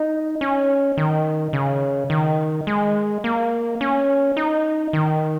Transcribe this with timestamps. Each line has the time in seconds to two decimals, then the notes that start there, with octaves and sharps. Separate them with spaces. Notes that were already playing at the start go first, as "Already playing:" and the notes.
Already playing: D#4
0.41 C#4
0.97 D#3
1.53 C#3
2.10 D#3
2.67 G#3
3.24 A#3
3.81 C#4
4.37 D#4
4.93 D#3